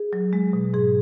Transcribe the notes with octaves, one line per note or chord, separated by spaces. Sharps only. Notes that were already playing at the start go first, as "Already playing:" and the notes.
Already playing: G#4
F#3
G#3
B2
G#2 G#4